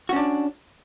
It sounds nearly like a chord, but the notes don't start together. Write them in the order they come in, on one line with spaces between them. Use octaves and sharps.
F#4 C#4 D4